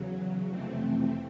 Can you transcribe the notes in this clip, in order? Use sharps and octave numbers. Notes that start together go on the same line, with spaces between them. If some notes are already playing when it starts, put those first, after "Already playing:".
Already playing: E2 C#3 F#3
F2 C3 E3 A3 C4